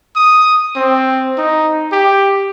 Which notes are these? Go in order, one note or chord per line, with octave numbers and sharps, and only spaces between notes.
D#6
C4
D#4
G4